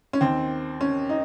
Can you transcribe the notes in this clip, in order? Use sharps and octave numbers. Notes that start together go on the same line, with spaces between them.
C#4
D#2 D#3 C4
C#4
D#4